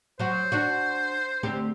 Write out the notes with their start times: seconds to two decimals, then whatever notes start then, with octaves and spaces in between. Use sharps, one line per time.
0.19 F#3 F#4 C5
0.52 D4 F#4
1.43 D2 C4 G4